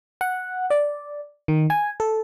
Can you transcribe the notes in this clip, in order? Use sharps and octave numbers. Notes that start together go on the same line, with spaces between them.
F#5
D5
D#3
G#5
A4